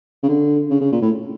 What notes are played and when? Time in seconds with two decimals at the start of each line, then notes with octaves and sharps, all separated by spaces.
0.23 C#3
0.29 D3
0.70 C#3
0.81 C#3
0.92 A#2
1.02 A2